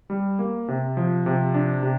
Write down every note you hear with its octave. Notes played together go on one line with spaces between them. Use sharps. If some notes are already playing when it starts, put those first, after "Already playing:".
G3
A#3
C3
F3
C3
D4
C3